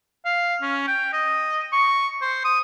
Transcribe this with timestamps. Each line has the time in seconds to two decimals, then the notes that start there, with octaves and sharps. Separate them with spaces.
0.25 F5
0.61 C#4
0.87 G5
1.13 D#5
1.72 C#6
2.21 C5
2.44 D#6